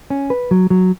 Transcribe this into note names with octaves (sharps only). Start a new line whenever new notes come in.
C#4
B4
F#3
F#3